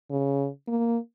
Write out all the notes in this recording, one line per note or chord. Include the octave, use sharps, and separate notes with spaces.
C#3
A#3